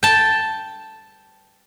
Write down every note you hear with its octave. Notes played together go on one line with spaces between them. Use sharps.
G5 A5